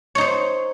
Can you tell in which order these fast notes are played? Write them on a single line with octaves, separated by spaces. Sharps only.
C#5 D#4 C5